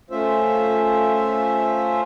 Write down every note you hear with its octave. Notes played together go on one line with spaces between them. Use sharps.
A3 C#4 F4 C5 E5